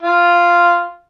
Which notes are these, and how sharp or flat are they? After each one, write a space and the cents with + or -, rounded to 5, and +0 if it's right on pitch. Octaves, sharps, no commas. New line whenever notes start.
F4 -5